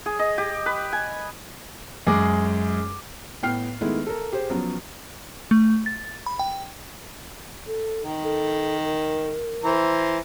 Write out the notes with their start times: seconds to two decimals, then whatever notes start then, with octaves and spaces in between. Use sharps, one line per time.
0.06 G#4
0.19 D#5
0.38 G4
0.66 B4
0.93 G#5
2.07 F#2 G#3 G#4 D6
3.43 A2 B3 G5 F6 C7
3.81 D#3 G#3 A3 B3 E4
4.07 A4 A#4
4.32 G4 G#4 C5
4.50 F3 F#3 B3 C#4
5.51 A3
5.86 A6
6.26 B5
6.39 G5
7.67 A4
8.02 D#3
8.24 A4
8.85 A#4
9.64 E3 C5 A#5